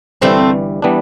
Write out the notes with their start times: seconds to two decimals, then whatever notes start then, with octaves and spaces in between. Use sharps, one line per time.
0.21 G1 G2 E3 G3 A3 C4
0.82 E3 G3 B3 D4